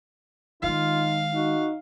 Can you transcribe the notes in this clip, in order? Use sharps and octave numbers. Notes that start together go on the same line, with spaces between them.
D#3 G#3 D#4 F4 F5
D#4 F#4